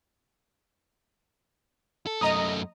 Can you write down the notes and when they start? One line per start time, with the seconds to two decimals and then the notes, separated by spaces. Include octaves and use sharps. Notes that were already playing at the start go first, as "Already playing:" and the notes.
2.07 A4
2.21 F#2 A3 D#5 A#5 D#6